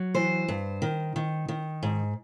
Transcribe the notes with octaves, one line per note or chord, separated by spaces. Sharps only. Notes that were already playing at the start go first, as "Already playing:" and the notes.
Already playing: F#3
E3 C5
G2
D#3
D#3
D#3
G#2